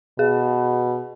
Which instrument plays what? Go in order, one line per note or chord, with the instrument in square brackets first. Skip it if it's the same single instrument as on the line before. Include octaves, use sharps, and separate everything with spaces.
[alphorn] B2 [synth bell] G#4